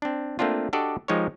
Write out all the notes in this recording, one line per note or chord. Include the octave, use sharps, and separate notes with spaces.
C4 D4
A3 A#3 C4 D4 F4
D4 F#4 G4 A4 D5 D#5
F3 G#3 D#4 G4 A#4 C#5